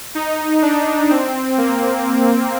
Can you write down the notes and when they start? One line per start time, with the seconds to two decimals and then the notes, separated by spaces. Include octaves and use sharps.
0.15 D#4
0.62 D4
1.10 C4
1.58 A#3